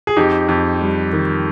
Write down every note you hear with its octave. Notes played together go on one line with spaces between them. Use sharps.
G#4
F2 D#4 G4
F2
G3
D#3